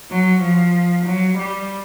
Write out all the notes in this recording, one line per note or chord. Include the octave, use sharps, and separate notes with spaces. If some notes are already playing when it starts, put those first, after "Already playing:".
F#3
F3
F#3
G3